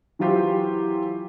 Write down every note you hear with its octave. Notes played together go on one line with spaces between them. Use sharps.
E3 F#3 E4 F4 G4 C5